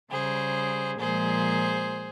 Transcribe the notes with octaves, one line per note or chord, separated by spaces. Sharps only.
C#3 G3 G#4 C5
A#2 F3 G#3 G#4 C5